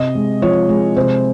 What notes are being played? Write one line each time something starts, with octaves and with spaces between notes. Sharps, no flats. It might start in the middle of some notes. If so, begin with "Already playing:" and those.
Already playing: C3 D#5
G#3
F3 C#5
G#3
C3 C5